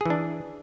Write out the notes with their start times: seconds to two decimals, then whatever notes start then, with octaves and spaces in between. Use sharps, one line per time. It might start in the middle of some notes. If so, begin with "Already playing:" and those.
0.01 G#4
0.06 E3
0.10 D4